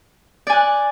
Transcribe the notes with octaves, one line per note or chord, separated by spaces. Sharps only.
D5 G#5 F#6